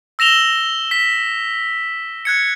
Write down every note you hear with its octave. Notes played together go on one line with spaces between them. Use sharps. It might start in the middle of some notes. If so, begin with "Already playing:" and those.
E6 A#6 E7 F7 G7
B6
F#6 G#6 C#7